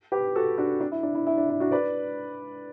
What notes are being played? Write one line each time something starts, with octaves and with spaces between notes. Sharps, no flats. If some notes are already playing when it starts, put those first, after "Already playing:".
G4 B4
F#4 A4
D4 F#4
D4
E4
D4
E4
E4
D4
E4
D4 F#4
B4 D5